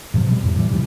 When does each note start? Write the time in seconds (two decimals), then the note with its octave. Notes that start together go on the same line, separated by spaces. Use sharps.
0.14 G#2 C3 F3 F#3
0.27 B2 G3
0.44 E2 A2
0.55 E3 G3
0.70 G#2 C3 E3 F3